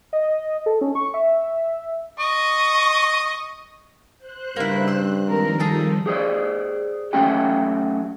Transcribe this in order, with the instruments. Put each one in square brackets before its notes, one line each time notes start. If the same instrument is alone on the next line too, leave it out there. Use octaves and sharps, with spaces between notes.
[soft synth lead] D#5
A4
C#4
C#6
E5
[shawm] D#5 [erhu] C#6
[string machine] C5 F#6
[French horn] G2 [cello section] C#3 G3 [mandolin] A#3 E4
[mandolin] E6
[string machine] D#3 F3 G3 [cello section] G#3 C4 A#4
[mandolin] G#4 A4
[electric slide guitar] G4 G#4 C5 D5
F#3 A3 C#4 F#4 G4 G5